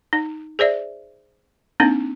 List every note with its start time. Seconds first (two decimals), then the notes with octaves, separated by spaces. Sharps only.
0.13 D#4
0.59 G#4 C5 D5 E5
1.80 A#3 C4 D4 D#4